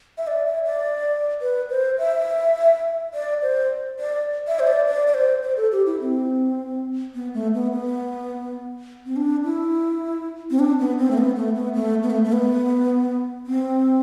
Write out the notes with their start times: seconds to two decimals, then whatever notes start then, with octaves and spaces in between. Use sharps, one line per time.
0.18 E5
0.27 D5
0.46 E5
0.66 D5
1.42 B4
1.70 C5
1.98 E5
3.14 D5
3.42 C5
4.00 D5
4.47 E5
4.59 C5
4.67 D5
4.86 D5
5.07 D5
5.14 C5
5.43 C5
5.57 A4
5.72 G4
5.86 E4
6.01 C4
7.15 B3
7.34 A3
7.54 B3
7.73 B3
9.06 C4
9.16 D4
9.44 E4
10.51 C4
10.59 D4
10.79 B3
10.98 C4
11.11 A3
11.18 B3
11.36 A3
11.55 B3
11.74 A3
12.03 B3
12.10 A3
12.24 A3
12.32 B3
13.46 C4